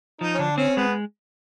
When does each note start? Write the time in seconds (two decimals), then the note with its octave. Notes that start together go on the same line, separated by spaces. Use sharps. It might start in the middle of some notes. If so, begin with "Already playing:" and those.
0.21 F3 D#4
0.34 C#4
0.39 D3 D4
0.57 C4 C#4
0.76 G#3 B3